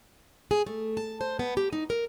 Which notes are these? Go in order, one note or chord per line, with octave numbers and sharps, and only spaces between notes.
G#4
A3
A5
C5
B3
G4
D#4
A#4